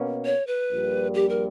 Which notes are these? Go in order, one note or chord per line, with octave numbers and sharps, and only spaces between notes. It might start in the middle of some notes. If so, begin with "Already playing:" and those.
Already playing: B2 A#3 C#4
C#5
B4
A#1 A#2 G3
G4
A#4